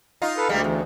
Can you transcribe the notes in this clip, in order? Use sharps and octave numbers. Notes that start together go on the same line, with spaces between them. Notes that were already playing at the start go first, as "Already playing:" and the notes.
D#4 F4
A4 B4 F5
D2 G3 G#3 A#3
E2